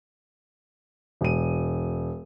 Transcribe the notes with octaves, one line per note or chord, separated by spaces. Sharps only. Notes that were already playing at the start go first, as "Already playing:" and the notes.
E1 D#7